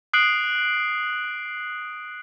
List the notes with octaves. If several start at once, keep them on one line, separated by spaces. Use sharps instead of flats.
D#6 F#6 C7 D7 F#7